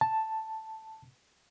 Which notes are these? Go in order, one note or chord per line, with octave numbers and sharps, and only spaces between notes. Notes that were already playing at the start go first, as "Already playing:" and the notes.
A5